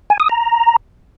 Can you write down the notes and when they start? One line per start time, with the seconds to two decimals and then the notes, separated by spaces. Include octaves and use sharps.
0.10 G#5
0.20 D#6
0.29 A#5